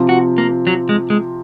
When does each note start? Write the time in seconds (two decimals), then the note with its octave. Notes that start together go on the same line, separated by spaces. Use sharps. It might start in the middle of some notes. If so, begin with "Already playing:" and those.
Already playing: C3 F3 C4 F4
0.09 F#4
0.38 A#3
0.67 F#3
0.89 G#3
1.10 G#3